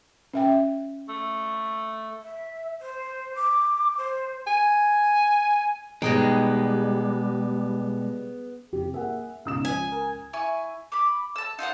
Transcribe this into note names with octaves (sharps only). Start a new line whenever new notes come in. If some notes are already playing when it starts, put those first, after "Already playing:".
C#4 E5 G5
A3
E5
C5
D6
C5
G#5
B2 G3 G#3 B3 D#4 G#4 D#5 G5
F2 C3 G4
A#3 G#4 A#4 E5 F#5
C#2 B2 D#4 F5 D#6 E7
F3 G#5
A#4
E4 G#5 C#6
B5 D6
A5 E6
D#4 F4 F5 F#5